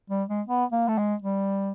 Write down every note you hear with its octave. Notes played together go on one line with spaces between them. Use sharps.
G3
G#3
B3
A#3
A3
G#3
G3